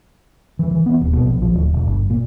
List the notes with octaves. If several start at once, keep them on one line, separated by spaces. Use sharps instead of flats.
E3
E3
B3
D#1
B2
A#1
F3
D1
E1
G1
A#2